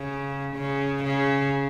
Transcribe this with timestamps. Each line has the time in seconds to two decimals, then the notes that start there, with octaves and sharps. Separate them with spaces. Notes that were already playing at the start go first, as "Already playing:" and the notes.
Already playing: C#3
0.55 C#3
1.04 C#3